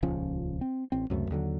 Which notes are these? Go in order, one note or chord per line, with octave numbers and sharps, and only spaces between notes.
D#1 C#2 F3 C#4
C4
A1 C4
C#2 F#2 C3 A3
D#2 D3 F#3